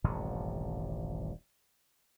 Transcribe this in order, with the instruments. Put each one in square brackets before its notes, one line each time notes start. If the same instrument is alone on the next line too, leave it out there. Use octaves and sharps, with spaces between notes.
[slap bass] D#1 A1 G2 C3